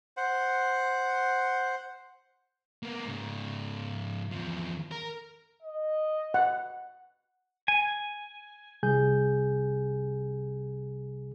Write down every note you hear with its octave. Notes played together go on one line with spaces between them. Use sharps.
C5 F#5
A#3 B3
G#2 C#3
E2 F3
A#4
D#5
F#5
G#5
C2 C3 G3 G#4 G#5 G6